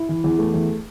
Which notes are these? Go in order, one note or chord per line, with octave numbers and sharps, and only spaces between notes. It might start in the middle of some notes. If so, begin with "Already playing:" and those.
Already playing: E4
E3
E2
A3
E2